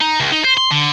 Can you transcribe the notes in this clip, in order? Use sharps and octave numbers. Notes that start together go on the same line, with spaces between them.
D#4
C#2
D#4
C5
C6
D3